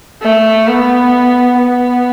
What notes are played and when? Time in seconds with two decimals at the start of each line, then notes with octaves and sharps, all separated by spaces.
0.22 A3
0.67 B3
1.58 B3